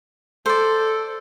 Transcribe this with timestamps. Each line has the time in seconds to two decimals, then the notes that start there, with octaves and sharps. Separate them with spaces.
0.46 A4 C5 D5